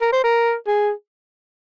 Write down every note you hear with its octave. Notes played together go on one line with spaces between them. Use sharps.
A#4
C5
A#4
G#4